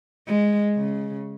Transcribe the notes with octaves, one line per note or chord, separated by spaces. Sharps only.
G#3
C#3